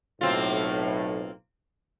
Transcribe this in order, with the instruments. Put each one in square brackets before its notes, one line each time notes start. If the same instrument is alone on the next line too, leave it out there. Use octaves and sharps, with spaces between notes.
[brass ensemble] B1 A2 [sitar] A#3 C4 F4